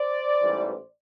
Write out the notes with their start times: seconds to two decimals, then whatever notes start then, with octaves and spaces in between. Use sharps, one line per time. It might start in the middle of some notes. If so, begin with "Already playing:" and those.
Already playing: C5 D5
0.41 A1 G#2 E3 G3